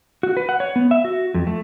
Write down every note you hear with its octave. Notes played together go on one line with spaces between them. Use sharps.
F#4
B4
F#5
C#5
B3
E5
F#4
F2
A3